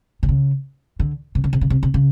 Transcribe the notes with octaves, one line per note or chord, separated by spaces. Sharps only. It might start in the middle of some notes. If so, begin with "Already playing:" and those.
C3
C#3
D3
C3
C#3
C3
C#3
C3
C3
C#3